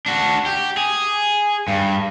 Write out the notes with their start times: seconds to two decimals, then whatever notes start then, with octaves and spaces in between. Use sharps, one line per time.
0.06 D4 F#4
0.46 G4
0.77 G#4
1.68 G2